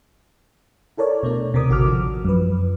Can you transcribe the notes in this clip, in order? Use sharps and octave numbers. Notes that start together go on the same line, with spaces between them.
E4 A4 A#4 C#5 D5
B2 A3 D4
D#2 C3 C4 A#4 D6 D#6
A1 D3 F#4 A4 D6 F6
F3
F#2 F3 B4